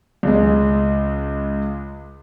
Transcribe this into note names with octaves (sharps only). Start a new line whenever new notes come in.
C#2 G#3